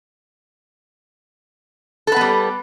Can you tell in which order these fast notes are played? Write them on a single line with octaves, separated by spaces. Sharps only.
A4 B4 B3 G3